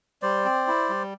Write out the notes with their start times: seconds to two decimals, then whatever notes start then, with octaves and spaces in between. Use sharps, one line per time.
0.22 G3 C5 D5
0.45 C4
0.67 E4
0.89 G3